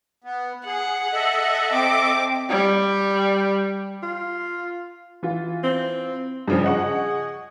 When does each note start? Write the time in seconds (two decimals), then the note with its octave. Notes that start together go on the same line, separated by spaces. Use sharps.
0.24 B3
0.66 G#4 F#5
1.13 A4 D#5 E5
1.73 C4 D6
2.49 G3
4.03 F4
5.23 E3 F4
5.63 C4
6.48 G2 C#3 F3 G#4
6.64 D#5 F#5 C#6